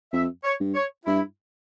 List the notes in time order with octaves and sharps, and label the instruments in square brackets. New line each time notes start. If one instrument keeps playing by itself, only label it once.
[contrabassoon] F2 [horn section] E5
[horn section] C#5
[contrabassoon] G2
[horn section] C#5
[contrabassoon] G2 [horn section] E4